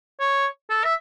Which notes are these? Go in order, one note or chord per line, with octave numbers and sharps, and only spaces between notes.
C#5
A4
E5